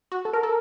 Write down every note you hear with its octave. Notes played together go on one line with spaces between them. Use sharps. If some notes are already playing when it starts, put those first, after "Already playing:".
F#4
A4
A#4
A4